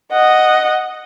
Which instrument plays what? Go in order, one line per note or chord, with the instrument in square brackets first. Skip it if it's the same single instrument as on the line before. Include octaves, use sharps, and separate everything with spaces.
[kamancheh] D#5 F#5